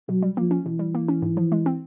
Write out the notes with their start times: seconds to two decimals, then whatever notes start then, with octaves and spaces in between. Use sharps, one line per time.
0.09 B2 F#3
0.22 G3
0.37 F3 A#3
0.51 C#4
0.65 B2 E3
0.79 G3
0.95 A#3
1.08 C#4
1.22 G#2
1.37 F3
1.52 G#3
1.66 C4